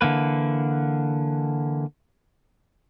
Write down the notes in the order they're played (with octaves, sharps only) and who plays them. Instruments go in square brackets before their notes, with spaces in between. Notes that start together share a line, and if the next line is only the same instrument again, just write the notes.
[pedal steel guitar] D3 E3 A#3 B4